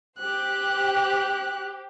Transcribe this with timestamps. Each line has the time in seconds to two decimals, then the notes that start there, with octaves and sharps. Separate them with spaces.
0.18 G4 C5 F#6